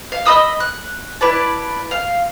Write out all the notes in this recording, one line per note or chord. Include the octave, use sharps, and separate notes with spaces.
F5
D#5 B5 D#6 E6
F#6
E4 B4 D5 A5
F5